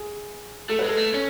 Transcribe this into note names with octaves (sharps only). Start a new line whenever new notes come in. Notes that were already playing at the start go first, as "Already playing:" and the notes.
Already playing: G#4
A3 A4
G#3 B4
A4
A3
C#4